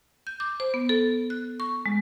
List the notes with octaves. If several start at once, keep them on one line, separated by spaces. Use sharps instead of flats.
G6
D6
C5
B3
A4
F#6
C#6
G#3